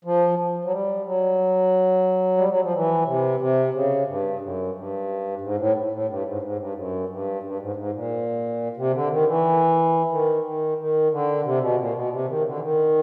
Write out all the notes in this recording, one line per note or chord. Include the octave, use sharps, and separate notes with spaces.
F3
F#3
G3
F#3
G3
F#3
F3
E3
C3
C3
C#3
G2
F#2
G2
G#2
A2
A2
G2
G#2
G#2
G2
F#2
G2
G2
G#2
G#2
A#2
C3
D3
D#3
E3
D#3
D#3
D#3
D3
C3
B2
A#2
B2
C3
D#3
C#3
D3
E3
D#3